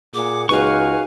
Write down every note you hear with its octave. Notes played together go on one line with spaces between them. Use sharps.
A#2 G#4 F#5 D6
C#2 D#4 F#4 G#4 B4 F5 C#6